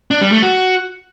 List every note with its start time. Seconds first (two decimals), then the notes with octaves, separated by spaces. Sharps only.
0.11 D4
0.21 G3
0.32 A3
0.43 F#4